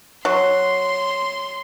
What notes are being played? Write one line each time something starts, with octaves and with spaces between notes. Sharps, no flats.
F#3 C6